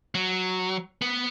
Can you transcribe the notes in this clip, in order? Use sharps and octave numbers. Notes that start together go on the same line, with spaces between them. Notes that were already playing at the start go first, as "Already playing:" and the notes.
F#3
B3